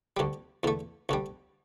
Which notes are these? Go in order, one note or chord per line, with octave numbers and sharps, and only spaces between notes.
D2 D3 G3
E2 D3 A3
D2 D3 G3